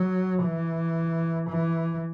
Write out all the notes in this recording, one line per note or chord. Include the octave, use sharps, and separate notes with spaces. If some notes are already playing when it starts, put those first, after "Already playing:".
Already playing: F#3
E3
E3